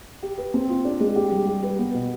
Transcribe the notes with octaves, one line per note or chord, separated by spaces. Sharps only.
G4
B4
C4
F4
D4
G#3
G4
G3
G4
B4
B3
B2